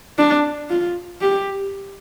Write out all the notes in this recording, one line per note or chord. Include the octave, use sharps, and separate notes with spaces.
D4
F4
G4